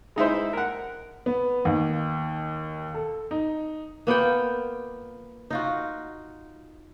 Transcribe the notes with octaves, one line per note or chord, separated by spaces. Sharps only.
G#3 D#4 E4 C5
A#4 F#5
B3
D#2
A4
D#4
A#3 B3 F4 G5
D#4 F4 F#4